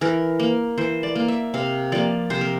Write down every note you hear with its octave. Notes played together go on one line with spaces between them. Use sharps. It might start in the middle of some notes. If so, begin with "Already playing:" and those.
E3 A#4
A#3
E3 C5
D5
A#3
E5
C3 F5
F3 A#3 D5
C3 C5
A#4